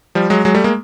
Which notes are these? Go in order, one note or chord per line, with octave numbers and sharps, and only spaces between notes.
F3 G3
F#3 G#3
F#3 G#3
G3 A3
G#3 A#3